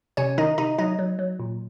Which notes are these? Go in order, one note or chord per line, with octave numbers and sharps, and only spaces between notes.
C3 C#4 C#5
D#3 D#4 D#5
C3 D#4 D#5
F#3 D#4 D#5
F#3
F#3
A#2